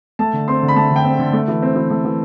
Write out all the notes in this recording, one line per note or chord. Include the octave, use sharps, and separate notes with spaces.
A3 A5
D3
C4 C6
D3
B5
A3 A5
D3
G5
C4
D3
A3
E3
C4
E3
A3
E3